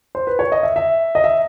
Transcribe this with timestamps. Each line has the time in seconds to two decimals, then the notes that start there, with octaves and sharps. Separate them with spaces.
0.15 C5
0.27 B4
0.39 C#5
0.52 D#5
0.63 E5
0.76 E5
1.15 D#5
1.24 E5